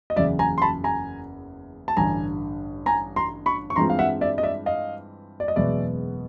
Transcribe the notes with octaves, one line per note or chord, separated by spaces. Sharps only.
D#5
F#1 E2 C#3 D5 E5
G#5 A#5
C6
A5 B5
G#5 A#5
A5
A1 G2 D3 G#5 A#5
G#5 A#5
A#5 C6
B5 C#6
C#6
G2 E3 G#3 C4 F4 A#5 C6
F5
E5 F#5
D5 E5
D#5
D5 E5
D#5 F5
D5
D#5
F#1 E2 B2 G#3 B3 D5 E5